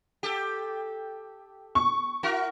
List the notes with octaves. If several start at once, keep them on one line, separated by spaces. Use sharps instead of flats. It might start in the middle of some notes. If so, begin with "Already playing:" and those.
G4 A4
C#6
E4 F#4 A#4